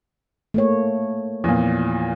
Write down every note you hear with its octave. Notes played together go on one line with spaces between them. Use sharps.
A3 A#3 C#5
E2 A#2 F3